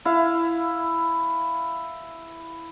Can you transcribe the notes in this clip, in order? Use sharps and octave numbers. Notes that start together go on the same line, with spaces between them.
E4 F5